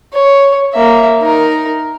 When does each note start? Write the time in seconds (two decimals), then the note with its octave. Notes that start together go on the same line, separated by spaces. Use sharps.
0.14 C#5
0.74 A#3 E5
1.20 D#4 A#4